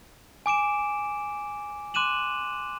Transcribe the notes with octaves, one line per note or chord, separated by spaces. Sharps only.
G#5 D6 D7 E7
C6 D6 F#6 D#7 E7 F#7